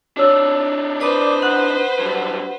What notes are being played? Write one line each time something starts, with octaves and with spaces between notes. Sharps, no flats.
D4 D#4 F#4 C#5 E6
B4 C5 D5 D6 D#6
F#5 D#6 F#6 F#7
G2 F#3